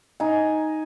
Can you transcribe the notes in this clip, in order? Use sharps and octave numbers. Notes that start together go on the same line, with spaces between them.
D#4 G#5